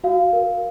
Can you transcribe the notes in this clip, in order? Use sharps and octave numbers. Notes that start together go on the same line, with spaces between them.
F#4 F5
A#4